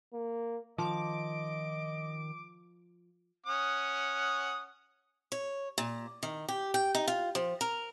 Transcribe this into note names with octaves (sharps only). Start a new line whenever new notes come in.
A#3
D#3 F3 D#5 D6
C#4 F#5 D#6
C#5
A#2
D#3
G4
G5
D#4
F4
F3
A#4